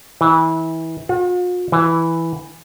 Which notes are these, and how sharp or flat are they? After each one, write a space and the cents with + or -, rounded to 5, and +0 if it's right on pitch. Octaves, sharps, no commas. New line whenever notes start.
E3 -25
F4 +45
E3 +0